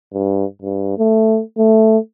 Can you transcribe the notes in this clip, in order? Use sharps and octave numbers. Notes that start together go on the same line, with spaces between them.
G2
G2
A3
A3